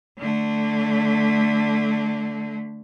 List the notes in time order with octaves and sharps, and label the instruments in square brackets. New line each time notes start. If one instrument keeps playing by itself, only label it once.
[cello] D3 A3